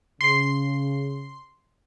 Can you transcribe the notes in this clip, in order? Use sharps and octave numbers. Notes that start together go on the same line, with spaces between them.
C#3 C6 C7